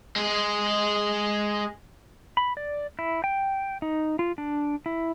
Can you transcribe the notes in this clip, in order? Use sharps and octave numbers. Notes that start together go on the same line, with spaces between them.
G#3 G#4
B5
D5
E4
G5
D#4
F4
D4
E4